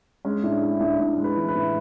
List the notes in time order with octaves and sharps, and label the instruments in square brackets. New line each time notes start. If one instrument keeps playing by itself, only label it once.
[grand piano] G#3 C#4
A2 D4
G#3 E4
A2 D4
A2 D4
G#3
B4
E3
B4
A2